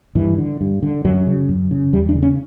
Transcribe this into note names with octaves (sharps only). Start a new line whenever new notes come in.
G2 E3
D3
G2
D3
F#2 F#3
C#3
F#2
C#3
E2 G3
D4
C#3
C#4